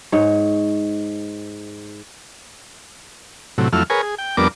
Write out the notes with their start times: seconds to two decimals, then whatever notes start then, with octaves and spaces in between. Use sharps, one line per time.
0.12 G#2 C#5
3.58 A2 C3 F#3
3.73 F2 F#3 A3 E4 F6
3.90 G#4 A#4 B4 C#5 G#5
4.03 G#4
4.18 G5
4.37 F2 G3 B3 D4 A#4 D6